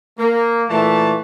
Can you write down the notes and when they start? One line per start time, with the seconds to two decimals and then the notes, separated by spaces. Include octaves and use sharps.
0.18 A#3
0.69 A#2 E3 A3 A5